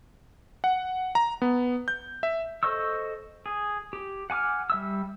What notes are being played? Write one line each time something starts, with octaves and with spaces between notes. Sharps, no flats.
F#5
A#5
B3
G6
E5
A4 C5 D#5 C#6 E6
G#4
G4
F#5 G#5 D6 F6
G3 E5 E6